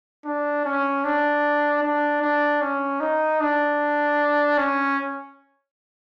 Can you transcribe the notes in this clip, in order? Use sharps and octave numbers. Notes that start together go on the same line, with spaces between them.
D4
C#4
D4
D4
D4
C#4
D#4
D4
C#4